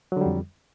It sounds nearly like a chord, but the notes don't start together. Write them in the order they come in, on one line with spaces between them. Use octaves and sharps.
F#3 D3 G3 F2